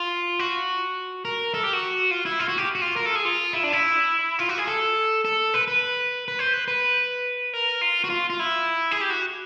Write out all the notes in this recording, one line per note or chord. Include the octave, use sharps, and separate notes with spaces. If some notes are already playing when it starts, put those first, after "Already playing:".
Already playing: F4
F#4
A#4
A4
G4
F#4
F4
E4
F4
F#4
G4
F#4
F4
A#4
A4
G#4
F4
E4
D4
E4
F4
F#4
G#4
A4
A4
B4
B4
B4
C5
B4
B4
A#4
F4
F#4
F4
F4
E4
G#4
G4
F#4